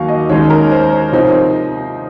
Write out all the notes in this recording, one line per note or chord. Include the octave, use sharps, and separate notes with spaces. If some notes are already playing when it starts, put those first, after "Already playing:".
Already playing: D#2 D#3 F#3 A#3 F5 C#6
D#5
D#2 D#3 G#3 C#4 C#5
A#4
C5
C#5
C3 F3 C4 D#4